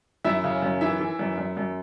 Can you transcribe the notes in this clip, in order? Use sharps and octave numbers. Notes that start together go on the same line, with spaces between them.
F#2 E4 E5
C#3
F#2
E3 E4 E5
E3
F#2
F#2
F#2